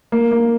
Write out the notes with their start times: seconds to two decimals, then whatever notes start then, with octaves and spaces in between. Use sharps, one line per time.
0.12 A#3
0.31 A#3